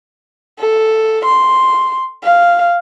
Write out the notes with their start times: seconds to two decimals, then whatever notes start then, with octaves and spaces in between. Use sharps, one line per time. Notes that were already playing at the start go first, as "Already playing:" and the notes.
0.60 A4
1.25 C6
2.24 F5